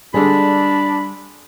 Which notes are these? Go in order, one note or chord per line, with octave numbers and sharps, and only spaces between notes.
D3 G3 G#3 D4 G#4 B5